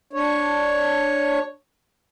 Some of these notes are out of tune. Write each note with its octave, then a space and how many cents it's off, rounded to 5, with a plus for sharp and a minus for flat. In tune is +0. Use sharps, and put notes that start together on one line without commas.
D4 +0 C#5 +0